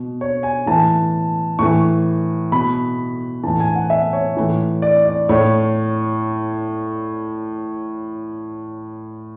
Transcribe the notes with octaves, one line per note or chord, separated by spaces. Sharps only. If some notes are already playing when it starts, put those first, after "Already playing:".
Already playing: B2
C#5
G#5
A2 E3 A5
A2 E3 C#6
B2 B5
A2 E3 A5
G#5
F#5
E5
C#5
A2 E3
D5
D5
A2 C#5